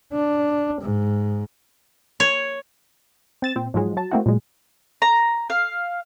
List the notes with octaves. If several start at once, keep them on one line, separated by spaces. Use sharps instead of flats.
D4
G#2
C#5
C4 A6 E7
A#2 C4
G#2 F3 F#3 G#3
F#3 A5
A3 A#3 C4 E4 F#4
A#2 F#3 G#3
A#5
F5